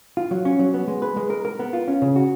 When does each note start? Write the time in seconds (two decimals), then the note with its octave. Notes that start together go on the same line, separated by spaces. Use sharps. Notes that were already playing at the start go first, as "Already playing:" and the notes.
0.17 F4
0.31 F#3
0.45 C#4
0.59 F#3
0.74 B3
0.88 G#3
1.02 B4
1.16 G#3
1.30 A#4
1.45 A#4
1.59 B3
1.73 F4
1.88 C#4
2.02 C#3
2.16 F#4